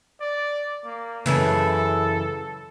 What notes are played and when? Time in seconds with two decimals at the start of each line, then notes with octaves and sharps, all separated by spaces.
0.21 D5
0.85 A#3
1.26 F#2 C#3 E3 A4